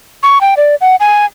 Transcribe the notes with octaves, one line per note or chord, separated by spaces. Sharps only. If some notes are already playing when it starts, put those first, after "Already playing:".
C#6
G5
D5
F#5
G#5